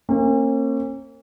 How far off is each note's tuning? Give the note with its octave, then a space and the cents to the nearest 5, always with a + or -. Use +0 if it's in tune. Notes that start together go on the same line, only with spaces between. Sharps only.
A#3 -30 C#4 -45